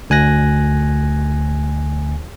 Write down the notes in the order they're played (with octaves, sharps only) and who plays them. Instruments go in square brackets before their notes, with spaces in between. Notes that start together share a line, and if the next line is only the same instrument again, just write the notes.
[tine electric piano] D2 G#5 F#6 A#6